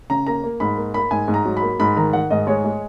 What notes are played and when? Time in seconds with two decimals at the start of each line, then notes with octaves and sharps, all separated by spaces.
0.10 C#3 A#5
0.27 A#3 A#5
0.44 A#3
0.60 G#2 B5
0.77 A#3
0.94 A#3 B5
1.11 G#2 G#5
1.28 G#2
1.34 A#5
1.45 F#3
1.57 B5
1.62 A#3
1.80 G#2 B5
1.96 D#3 A#5
2.13 D#3 F#5
2.30 G#2 D#5
2.47 G#3 C#5
2.64 G#3